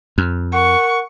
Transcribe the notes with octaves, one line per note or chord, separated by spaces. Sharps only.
F2
A#4 F#5 C#6